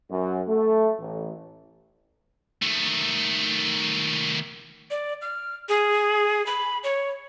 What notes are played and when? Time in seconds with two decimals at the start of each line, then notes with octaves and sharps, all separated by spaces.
0.10 F#2
0.48 A3
0.99 A1
2.62 D#3 A3
4.91 D5
5.22 F6
5.69 G#4
6.46 B5
6.84 C#5